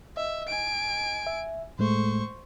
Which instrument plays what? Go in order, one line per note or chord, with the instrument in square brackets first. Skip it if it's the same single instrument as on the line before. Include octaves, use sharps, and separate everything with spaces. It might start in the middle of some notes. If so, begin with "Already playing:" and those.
[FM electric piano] D#5 [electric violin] E5
[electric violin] G#5 D7
[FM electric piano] E5
[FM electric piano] A2 G#3 A3 [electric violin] C5 C#6